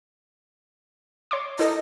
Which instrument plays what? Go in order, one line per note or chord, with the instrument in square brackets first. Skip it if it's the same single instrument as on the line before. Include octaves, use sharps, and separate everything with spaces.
[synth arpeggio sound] C#5 C6 D6
[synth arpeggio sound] E4 A4 [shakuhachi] D#5